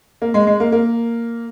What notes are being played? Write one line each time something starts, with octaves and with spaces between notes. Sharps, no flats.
A#3
G#3
G#3
A#3
A#3